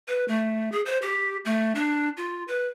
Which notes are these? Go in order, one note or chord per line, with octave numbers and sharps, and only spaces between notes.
B4
A3
G#4
C5
G4
A3
D4
F4
B4